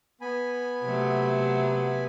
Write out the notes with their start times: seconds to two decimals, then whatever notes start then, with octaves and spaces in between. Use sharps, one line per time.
0.21 B3 G#5 B5
0.83 C3 F#3 A3